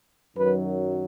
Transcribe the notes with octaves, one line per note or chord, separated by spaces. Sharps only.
F#2 D#3 F#3 B4